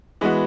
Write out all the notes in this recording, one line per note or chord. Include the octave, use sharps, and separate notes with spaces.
E3 G#3 B3 F#4